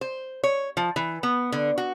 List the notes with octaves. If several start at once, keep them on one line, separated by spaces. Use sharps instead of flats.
C5
C#5
F3
E3
B3
D3
F#4